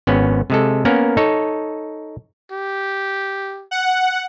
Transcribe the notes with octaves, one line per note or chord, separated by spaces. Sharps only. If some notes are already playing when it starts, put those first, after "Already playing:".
G#1 B3 C#4
C3 G#3 A4
A#3 B3 C#4 A#4
D#4 A4 C#5
G4
F#5